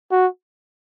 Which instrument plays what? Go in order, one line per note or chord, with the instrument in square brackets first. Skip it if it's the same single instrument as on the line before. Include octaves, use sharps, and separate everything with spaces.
[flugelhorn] F#4